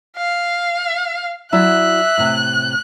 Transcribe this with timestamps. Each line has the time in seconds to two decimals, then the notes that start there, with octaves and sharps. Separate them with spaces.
0.17 F5
1.52 F#3 E4 D5 E5 F#6
2.18 A2 C3